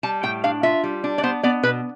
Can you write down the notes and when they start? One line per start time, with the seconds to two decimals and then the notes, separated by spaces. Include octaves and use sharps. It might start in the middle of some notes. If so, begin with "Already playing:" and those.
0.03 G3 A5
0.23 A2 G5
0.44 D4 F5
0.63 F4 E5
0.84 G3
1.04 D4
1.18 D5
1.23 B3 C5
1.43 B3 D5
1.63 B2 B4